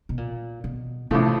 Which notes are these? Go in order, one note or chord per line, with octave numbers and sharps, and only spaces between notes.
B2
A#2
B2
A1 A2 C3 F3 A3